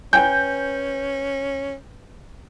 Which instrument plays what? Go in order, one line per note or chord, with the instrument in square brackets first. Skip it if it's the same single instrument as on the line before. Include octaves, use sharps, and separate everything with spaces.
[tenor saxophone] C#4 [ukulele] B4 G5 G#5 [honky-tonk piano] G6